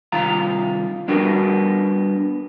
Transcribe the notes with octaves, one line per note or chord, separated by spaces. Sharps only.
C2 D#3 F4 F5 A#5
G3 B3 D4 F#4 A#4